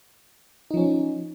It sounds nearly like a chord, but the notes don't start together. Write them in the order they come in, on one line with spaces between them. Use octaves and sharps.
D#4 F3 C#4